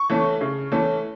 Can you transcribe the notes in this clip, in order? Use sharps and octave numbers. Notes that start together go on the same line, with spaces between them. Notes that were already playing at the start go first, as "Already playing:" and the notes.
Already playing: C#6
E3 A3 C#4
C#3
E3 A3 C#4